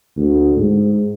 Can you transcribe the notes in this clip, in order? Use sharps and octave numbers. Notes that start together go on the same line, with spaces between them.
D2
G#2